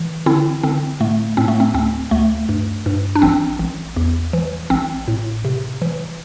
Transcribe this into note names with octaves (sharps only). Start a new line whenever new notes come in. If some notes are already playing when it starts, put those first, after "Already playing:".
Already playing: E3
D3 C4 E4
D3 C4
A2 A3
A2 C4
A3
C4
D2 C4
D2 A3
G2
G2
D4
A1 C4
A1
E2
E3
A1 C4
A2
C3
E3